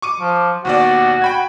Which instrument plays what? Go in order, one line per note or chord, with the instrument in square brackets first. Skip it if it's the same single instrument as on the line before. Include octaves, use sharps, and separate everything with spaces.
[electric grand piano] C#6 D6 D#7
[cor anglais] F3
[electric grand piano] D#2 B2 D5 [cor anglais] F#4
[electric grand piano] G5 B5 G#6